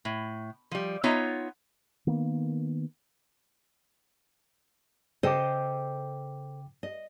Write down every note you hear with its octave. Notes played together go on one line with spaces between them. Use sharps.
A2
F3 G3
B3 D#4 F4 C#5 E5
D#3 A#3 B3
C#3 A4 C5 D#5 G5 D6
D#5